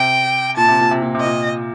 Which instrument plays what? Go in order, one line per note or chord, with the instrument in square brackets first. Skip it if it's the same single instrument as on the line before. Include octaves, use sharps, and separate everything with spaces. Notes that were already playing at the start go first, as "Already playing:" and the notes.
Already playing: [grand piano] C3 [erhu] G5
[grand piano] A#2 [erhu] A5
[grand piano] C3
A#2
C3
A#2
C3
[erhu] D#5
[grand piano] A#2